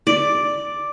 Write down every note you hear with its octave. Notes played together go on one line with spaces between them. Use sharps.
D5